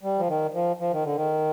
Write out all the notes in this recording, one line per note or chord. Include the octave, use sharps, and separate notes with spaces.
G3
F3
D#3
F3
F3
D#3
D3
D#3